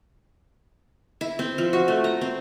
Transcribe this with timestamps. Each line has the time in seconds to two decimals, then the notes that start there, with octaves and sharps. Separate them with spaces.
1.21 E4
1.39 C4
1.58 F3
1.73 F#4
1.88 A3
2.04 A#5
2.21 C4